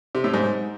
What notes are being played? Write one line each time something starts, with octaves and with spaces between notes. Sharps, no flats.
C3
A2
G#2